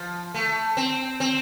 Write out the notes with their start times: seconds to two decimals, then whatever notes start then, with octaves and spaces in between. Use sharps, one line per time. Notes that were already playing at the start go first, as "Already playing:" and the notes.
Already playing: F3
0.34 A3
0.77 C4
1.20 C4